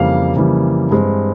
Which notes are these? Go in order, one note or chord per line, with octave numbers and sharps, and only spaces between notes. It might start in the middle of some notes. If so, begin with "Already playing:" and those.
Already playing: F2 C#3 E3 G3 A#3 F5
F2 C#3 E3 G3 A#3
G2 E3 G#3 C4